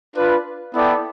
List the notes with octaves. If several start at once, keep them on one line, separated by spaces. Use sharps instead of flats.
D4 F4 B4
B3 E4 A4 D5 G5